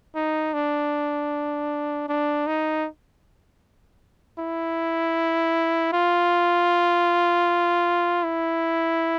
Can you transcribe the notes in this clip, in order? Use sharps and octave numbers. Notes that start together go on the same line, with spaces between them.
D#4
D4
D4
D#4
E4
F4
E4